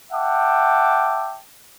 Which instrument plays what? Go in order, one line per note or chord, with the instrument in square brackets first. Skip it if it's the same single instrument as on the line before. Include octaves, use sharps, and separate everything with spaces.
[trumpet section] E5 F#5 G5 A5 D6